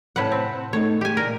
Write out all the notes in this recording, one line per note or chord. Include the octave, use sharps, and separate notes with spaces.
A2 C3 E3 B4 F#5 A5
C4
A3 B3 D#4 C#5
G#3 G4 G#5
G2 A#2 A#4